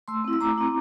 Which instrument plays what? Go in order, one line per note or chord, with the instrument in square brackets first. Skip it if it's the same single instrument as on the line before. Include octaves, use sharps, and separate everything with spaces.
[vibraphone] A3 C6 E6
C4 E4
E6
A3 A#5 D6
C4 E4